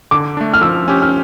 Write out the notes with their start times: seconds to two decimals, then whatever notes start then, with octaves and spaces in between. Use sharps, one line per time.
0.11 D3 D6
0.37 A3 D4
0.53 F6
0.61 F3 E6
0.88 C#4 G4
1.02 F6